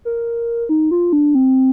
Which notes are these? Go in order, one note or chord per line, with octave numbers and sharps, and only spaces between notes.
A#4
D#4
F4
D4
C4